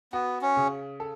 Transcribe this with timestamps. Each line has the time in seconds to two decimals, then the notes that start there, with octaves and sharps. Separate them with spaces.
0.12 B3 F#4
0.42 C#4
0.57 C#3
1.00 A4